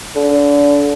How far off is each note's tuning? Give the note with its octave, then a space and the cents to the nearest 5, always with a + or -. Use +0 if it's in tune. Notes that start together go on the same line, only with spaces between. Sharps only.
D3 -30